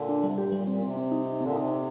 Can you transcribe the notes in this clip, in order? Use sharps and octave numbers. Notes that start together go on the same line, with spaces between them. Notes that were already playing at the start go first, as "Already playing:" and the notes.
Already playing: A#2 D3
D4
C3 G3
A#2 G4
G2
A#2 G3
A#2 C4
C3 C4
C4
D#4
D#4
A#2 D3 C4
C3 D#4